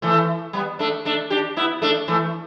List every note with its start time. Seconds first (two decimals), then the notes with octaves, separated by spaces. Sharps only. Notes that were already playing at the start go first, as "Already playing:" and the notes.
0.02 E3 A3
0.53 G3 B3
0.79 A3 D4
1.05 A3 D4
1.30 D4 G4
1.57 B3 E4
1.82 A3 D4
2.08 E3 A3